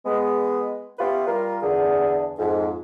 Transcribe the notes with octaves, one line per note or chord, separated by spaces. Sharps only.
G#3 B3
B3 C#4 E4 F4 G4 B4
G3 F4 A#4
E2 D3 G#4
F2 G#2